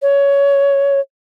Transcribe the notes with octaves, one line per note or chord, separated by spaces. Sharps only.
C#5